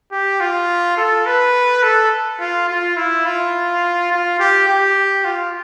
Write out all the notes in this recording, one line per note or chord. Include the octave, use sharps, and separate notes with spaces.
G4
F4
A4
B4
A4
F4
F4
E4
F4
F4
G4
G4
F4